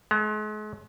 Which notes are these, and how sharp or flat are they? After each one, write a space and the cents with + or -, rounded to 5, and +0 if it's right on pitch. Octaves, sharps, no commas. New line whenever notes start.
G#3 +40 A#5 +0